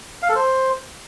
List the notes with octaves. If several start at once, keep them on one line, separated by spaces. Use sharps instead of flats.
F5
A4
C5